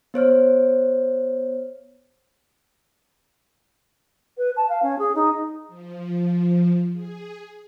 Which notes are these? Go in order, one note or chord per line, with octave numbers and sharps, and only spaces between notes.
B3 C5 C#5 F6
B4
A5
F5
C#4
G#4
D#4
F3
G#4